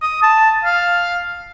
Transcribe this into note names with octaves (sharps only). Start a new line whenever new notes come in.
D#6
A5
F5